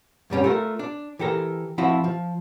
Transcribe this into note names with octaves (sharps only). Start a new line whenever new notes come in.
F#2 C3 G3 C#4
A3 F4 A#4
D4
E3 G4 A4 A#4
F3 C4 E4 F#4
F3